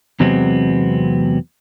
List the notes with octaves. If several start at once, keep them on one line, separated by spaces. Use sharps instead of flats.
E2 C3 F#3 G#3 B3 C4